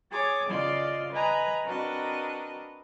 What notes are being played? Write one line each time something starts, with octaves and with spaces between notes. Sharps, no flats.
G#4 C#5 D6 A6
C#3 F4 D5 D#5 C6
B4 D#5 G#5 A#5 B5
C4 D4 F#4 A#4 B4 D#5